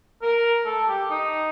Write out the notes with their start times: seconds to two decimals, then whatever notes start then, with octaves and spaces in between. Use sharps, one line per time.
0.22 A#4
0.66 A4
0.88 G4
1.10 D#4